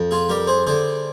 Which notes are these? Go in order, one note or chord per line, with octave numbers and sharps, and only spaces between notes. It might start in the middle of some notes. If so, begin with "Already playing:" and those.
Already playing: F2
F4 G#4
G3 G4 A#4
G#4 C5
D3 G#4 C5